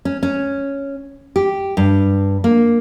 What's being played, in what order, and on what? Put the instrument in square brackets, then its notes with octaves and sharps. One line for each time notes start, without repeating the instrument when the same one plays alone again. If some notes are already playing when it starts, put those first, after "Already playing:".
[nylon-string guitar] C#4
C#4
G4
G2
A#3